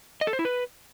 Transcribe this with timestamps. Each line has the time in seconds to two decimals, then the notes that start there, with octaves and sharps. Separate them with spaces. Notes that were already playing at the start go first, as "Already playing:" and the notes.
0.21 D#5
0.27 A4
0.33 C5
0.39 E4
0.45 B4